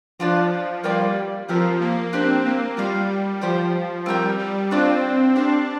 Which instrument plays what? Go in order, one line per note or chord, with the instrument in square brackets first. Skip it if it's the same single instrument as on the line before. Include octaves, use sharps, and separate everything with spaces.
[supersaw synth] F3 [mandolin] D4 F4 D5
[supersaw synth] G3 [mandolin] A#3 F4 D5 G5
[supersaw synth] F3 [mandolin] C4 G4 A#4 F5
[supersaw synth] A#3
[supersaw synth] C4 [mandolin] D4 G4 A#4
[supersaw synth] A#3
[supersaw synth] G3 [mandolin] F4 D5 F5
[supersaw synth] F3 [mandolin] G4 C5 G5
[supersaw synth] G3 [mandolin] C4 A#4 G5
[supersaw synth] G3
[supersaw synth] C4 [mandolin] D4 F4 D5
[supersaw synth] D4 [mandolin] G4 C5 F5